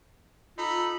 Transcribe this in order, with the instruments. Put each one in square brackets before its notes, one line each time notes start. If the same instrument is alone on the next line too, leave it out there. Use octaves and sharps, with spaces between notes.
[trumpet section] D#4 A4 B5 [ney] F4